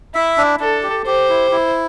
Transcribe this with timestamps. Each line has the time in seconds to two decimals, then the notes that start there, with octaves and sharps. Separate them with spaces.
0.14 E4 E5
0.38 D4
0.60 D4 A4
0.83 G4
1.06 G4 C5
1.29 E4
1.51 E4